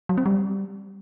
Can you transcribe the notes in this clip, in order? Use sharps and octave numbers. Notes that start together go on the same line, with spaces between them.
F#3
C4
G3